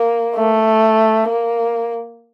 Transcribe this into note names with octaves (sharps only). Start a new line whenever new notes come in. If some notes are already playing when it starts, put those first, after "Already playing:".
Already playing: A#3
A3
A#3